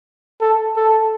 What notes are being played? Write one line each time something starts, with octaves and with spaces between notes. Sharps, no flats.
A4
A4